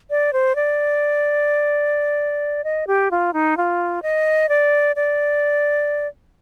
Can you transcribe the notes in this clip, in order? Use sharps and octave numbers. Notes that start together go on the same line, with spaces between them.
D5
C5
D5
D#5
G4
F4
D#4
F4
D#5
D5
D5